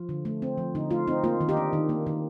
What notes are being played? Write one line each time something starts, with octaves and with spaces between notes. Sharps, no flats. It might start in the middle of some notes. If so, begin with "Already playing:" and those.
Already playing: F3 F4
D3
A3
C4
F3
D3 D#4
A3 F4
C4 D#4
A#3 F4
D#3
D#4 G4
D4
D#3
A#3
D#3